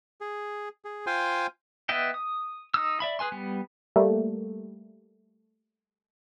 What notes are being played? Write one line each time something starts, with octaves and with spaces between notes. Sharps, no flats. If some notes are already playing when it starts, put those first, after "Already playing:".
G#4
G#4
F4 C5 F5 G5 G#5 C6
B3 B4 D#5 E5 G5
D#6
D#4 D#6 E6
D5 E5 B5
G#4 B4 G#5 C6
G3 B3
G3 A3 A#3